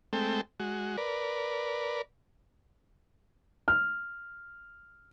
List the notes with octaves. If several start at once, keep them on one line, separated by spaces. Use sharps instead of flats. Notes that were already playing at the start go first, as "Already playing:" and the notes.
G#3 A3 C4 A4 G5
G#3 F#4
A#4 B4 D5
F6